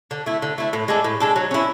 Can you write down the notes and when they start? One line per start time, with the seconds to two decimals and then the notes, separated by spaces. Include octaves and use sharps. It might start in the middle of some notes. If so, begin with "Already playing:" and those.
0.11 D3
0.26 A3 E4
0.42 D3
0.58 A3 E4
0.73 A2
0.88 G#3 D4 A4
1.04 A2
1.20 G#3 D4 A4
1.36 F#3
1.51 C#4 E4